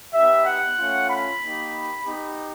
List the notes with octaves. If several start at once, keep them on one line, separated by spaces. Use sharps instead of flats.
B3 D#4 G4 E5
F#5
A3 C#4 F4
B5
A#3 D#4 G4
B3 D#4 G4